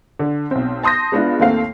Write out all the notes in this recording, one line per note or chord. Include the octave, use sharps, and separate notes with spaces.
D3
B1 C4
A5 C6 D#6 G6 A#6
G#3 B3 D4 E4 F4
D#2 A3 A#3 C4 F5 C7